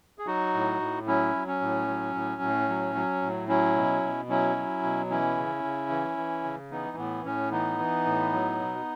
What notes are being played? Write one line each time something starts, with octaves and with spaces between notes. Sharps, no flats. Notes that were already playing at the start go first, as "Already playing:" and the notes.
G#4
F#3 D#4 F#4
A2
A2
F#3 C#4 E4
F#3
C#4
A2
F#3
A2
A2
F#3
F#3
A2
F#3 C#4 E4
B2
B2
F#3 C#4 E4
F#3
B2
E3 C#4 E4
C#3
C#3
E3
E3
C#3
E3 B3 D#4
A2 B3
A2 C#4
E3 B3 D#4
E3
A2
F#3
B2